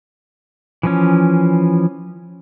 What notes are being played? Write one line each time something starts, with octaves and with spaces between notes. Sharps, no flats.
E3 F3 C#4